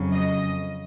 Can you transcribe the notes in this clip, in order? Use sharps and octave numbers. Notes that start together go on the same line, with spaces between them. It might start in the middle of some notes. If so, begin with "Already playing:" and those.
Already playing: F2 C#3 F#3
D#5